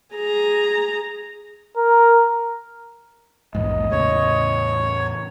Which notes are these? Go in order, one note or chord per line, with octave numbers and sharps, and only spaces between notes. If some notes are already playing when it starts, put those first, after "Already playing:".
G#4 A#5
A#4
A#1 E2 G#2 D#5
E2 A2 C#3 C#5